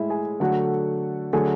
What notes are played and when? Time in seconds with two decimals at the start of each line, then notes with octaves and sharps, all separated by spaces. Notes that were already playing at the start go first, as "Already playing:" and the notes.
Already playing: A2 G#3 E4 E5
0.10 G#4 G#5
0.40 D3 F#3 A3 F#4 F#5
1.33 D3 F#3 A3 G#4 G#5